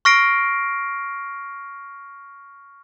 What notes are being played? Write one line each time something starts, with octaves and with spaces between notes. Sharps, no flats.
C#6 F6 A#6 C7 D7